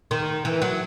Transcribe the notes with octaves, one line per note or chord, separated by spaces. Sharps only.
D#3
E3
F#3